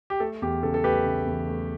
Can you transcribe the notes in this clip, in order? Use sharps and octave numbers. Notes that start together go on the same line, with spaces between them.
G4
A3 A4
E2 G4
C#3 A4
A4
A3 G4 B4
C#3
E2
A3